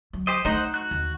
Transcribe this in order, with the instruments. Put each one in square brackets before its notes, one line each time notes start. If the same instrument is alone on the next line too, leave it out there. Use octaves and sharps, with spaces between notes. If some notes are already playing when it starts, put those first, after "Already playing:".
[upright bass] F#3
[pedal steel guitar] G4 C5 D#5
[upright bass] A3 [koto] D#4 D#5 [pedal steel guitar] C5 F#5
[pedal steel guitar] F#4 F#6
[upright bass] D#2